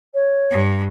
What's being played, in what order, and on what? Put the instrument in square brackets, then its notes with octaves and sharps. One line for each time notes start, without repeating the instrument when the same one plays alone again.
[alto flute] C#5
[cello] G2